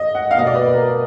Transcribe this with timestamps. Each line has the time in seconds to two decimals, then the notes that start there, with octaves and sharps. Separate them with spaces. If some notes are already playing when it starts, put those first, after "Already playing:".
Already playing: D#5
0.15 F#5
0.31 F5
0.35 B2 A#3 D#5
0.47 D5
0.55 B4
0.74 A#4